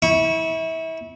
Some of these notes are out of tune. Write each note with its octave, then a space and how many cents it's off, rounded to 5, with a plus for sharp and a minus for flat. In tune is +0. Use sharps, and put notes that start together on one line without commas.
E4 -30 C#6 +0